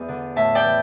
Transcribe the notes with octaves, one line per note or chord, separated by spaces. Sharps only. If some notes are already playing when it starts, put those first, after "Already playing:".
Already playing: E2 D5
D3
A2 E5 A5
D5 G5
E3